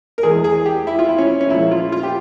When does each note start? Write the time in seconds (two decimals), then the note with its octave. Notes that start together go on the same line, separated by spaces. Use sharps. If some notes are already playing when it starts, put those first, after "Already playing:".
0.18 A#4
0.23 E2 E3 G#3 G#4
0.44 G#4
0.66 G4
0.87 E4
0.99 F4
1.09 E4
1.18 C#4
1.41 C#4
1.50 A#2 F3 G#3 E4
1.71 F4
1.92 F4
2.03 G4